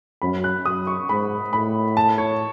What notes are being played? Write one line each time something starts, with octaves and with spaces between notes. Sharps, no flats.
F#2 B5
F#6
F#2 D#6
C#6
G#2 B5
A2 B5
A5
C#5